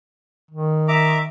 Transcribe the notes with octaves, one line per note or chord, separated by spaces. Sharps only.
D#3
E5 A#5 D6